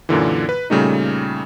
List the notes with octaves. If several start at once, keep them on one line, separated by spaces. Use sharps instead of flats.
F#2 A#2 D3 E3
B4
A#2 C#3 G3 A3 D#4